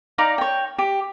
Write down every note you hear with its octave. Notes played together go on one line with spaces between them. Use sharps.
D#4 D5 F5 A#5
C#5 G5
G4